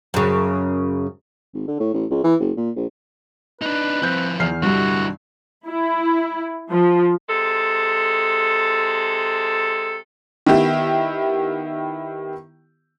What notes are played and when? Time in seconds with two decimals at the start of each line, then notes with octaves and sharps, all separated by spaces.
0.14 F#2 C#3
1.54 G#1
1.68 D3
1.80 A2
1.94 A1
2.11 C#2
2.24 E3
2.40 F#1
2.57 A#2
2.76 A#1
3.62 D4 D#4 B4
4.02 F3 C4 E4 G6
4.40 E2 F6 C7
4.63 C2 G2 D3 E4 F#4
5.67 E4
6.71 F3
7.28 C3 G#3 A4
10.46 D#3 B3 E4 G4